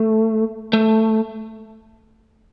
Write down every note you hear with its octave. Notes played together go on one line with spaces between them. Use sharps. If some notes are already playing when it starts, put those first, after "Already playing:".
Already playing: A3
A3